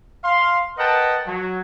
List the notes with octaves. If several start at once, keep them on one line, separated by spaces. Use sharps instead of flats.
F5 C6
A#4 B4 D#5 F#5 G5 A5
F#3